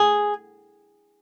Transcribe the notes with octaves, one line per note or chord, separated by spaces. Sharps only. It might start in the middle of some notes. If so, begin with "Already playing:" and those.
Already playing: G#4